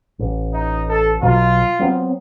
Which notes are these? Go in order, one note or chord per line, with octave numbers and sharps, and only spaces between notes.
A1
D#4
A4
B1 B2 F#3 F4
F#3 B3 C4